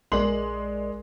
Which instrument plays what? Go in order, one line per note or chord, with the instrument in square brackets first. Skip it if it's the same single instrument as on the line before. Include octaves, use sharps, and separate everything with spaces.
[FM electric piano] A#1 A#4 D5 [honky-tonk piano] G#3 C6 F#7